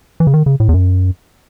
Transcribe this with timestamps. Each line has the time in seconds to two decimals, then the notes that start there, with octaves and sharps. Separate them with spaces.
0.20 E3
0.27 C#3
0.34 D#3
0.46 C#3
0.60 A2
0.69 E2
0.74 F#2